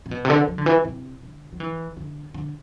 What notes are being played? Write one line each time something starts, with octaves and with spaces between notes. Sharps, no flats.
C3
B2
C3
D3
F#3
D3
E3
C3
D3
F#3
E3
D3
D3